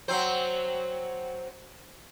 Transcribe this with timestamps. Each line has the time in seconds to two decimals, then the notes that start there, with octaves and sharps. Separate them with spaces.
0.08 F#3 C4 C5